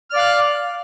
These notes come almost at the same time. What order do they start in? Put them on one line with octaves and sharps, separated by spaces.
F6 D5 F5 F#6